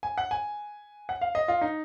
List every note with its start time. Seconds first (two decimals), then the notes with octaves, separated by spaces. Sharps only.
0.03 G#5
0.18 F#5
0.31 G#5
1.09 F#5
1.21 F5
1.35 D#5
1.48 F4
1.61 D#4